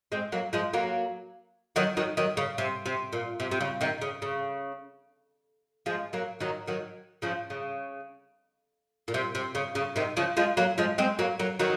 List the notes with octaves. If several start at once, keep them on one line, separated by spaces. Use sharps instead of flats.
G#3 C4
F#3 A#3
F3 G#3
F#3 A#3
D#3 F#3
D#3 F#3
D#3 F#3
C#3
C3
C3
A#2
C3
C3
C#3
C3 D#3
C#3
C#3
F3 G#3
F#3 A#3
D#3 F#3
D#3 F#3
C#3 F3
C#3
A#2
C3
C3
C#3
C#3
C3 D#3
C#3 F3
F3 G#3
F#3 A#3
F3 G#3
G#3 C4
F#3 A#3
F#3 A#3
D#3 F#3